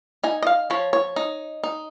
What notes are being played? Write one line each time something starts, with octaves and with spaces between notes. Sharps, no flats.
D#4 G#5
D#5
F5
F3 C#5
C#5
D#4
D#4